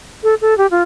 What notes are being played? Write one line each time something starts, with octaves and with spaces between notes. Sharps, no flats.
A4
A4
G4
F4